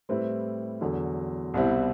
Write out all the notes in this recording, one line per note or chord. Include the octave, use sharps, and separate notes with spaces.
A2 G3 C4 E4 B4
E2 D3 F#3
C2 B2 G3 C4 E4